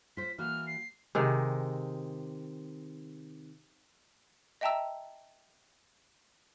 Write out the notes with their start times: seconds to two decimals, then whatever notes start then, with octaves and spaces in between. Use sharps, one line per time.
0.17 F4 C5 B6
0.38 E3 A#3 F#4 F6
0.67 C7
1.15 C3 D#3 G#3
4.61 D#5 E5 G5 A5 A#5 E6